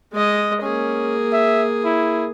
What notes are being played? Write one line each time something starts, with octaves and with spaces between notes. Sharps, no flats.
G#3 D#5
A#3 C#4 G#4
E5
E4